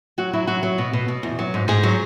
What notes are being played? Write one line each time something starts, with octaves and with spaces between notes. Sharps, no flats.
F#3 F#4
F#3 E4
F#3 F#4
F#3
B2
B2
B2
E2
F#3
G#2
G#2 G#4
F#3